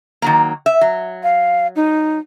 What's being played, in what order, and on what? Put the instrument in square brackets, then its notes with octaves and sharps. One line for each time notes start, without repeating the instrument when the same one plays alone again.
[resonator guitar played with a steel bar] D#3 F#3 A#3
E5
F#3
[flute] F5
D#4